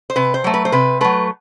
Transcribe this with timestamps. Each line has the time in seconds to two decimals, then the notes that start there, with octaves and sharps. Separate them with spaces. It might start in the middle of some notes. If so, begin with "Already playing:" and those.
0.10 C5
0.16 C3 B4
0.34 C5
0.44 F#3 A3
0.54 B4
0.65 C5
0.72 C3 B4
1.01 F#3 A3 B4